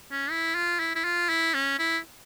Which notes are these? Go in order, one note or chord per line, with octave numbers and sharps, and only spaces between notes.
C#4
E4
F4
E4
E4
F4
E4
C#4
E4